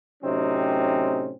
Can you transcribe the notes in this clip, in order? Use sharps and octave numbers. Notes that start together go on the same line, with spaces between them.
A2 C3 F#3 C4 C#4 D#4